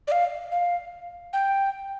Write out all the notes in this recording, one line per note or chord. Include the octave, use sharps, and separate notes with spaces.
D5
F5
F5
G5